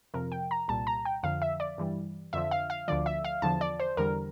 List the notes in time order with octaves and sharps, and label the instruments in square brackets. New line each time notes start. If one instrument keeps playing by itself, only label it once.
[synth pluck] F2 C3 F3 A#4
G5
A#5
C2 A#2 G3 A5
A#5
G5
F2 D3 F3 F5
E5
D5
G2 E3 G3
F2 D3 F3 E5
F5
F5
D2 D3 F3 D5
E5
F5
E2 D3 F3 A5
D5
C5
E2 D3 G3 A#4